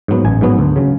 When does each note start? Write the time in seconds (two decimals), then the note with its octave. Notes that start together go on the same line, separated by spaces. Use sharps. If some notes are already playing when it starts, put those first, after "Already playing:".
0.08 G#2 F#3 B3
0.25 A1 G#5
0.41 G#2 F#3 B3
0.59 D2
0.76 C#3 F#3